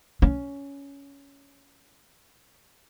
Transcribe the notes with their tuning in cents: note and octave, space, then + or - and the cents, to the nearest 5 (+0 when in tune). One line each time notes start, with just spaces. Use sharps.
C#4 +10